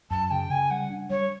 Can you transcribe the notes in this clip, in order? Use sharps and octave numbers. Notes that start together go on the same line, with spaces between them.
F#2 A5
C#3 G5
C#3 G#5
G3 F#5
D4
G3 C#5